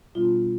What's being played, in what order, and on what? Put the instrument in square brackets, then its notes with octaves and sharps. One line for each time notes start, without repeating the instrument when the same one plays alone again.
[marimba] B2 G3 B3 D4 F4